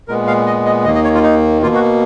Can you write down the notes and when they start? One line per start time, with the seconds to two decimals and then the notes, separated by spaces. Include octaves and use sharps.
0.08 A#2 G#3 B3 A#4
0.27 F5
0.47 D#5
0.66 D#5
0.85 D#2 D#3 A#3 D#5
0.95 D#5
1.04 C#5
1.15 F4
1.23 D#4
1.62 B2 A#3 F4
1.75 F#4